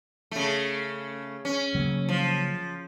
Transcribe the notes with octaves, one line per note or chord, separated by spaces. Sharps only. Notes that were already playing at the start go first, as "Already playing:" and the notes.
C#3 A3
C#4
C#3 F#3 A#3
F3